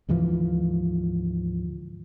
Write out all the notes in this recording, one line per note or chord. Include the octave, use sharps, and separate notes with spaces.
D2 G#2 E3 F3